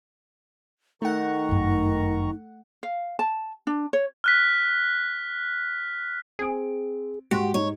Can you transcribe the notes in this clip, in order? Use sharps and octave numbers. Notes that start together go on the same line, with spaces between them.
D#3 A3 D#4 F#5 A#5 C#6
G1 F#2
F5
A5
D4
C#5
F6 F#6 B6
C4 G#4 D7
G#2 F#4 G4 C6
G#2 D#4 C#5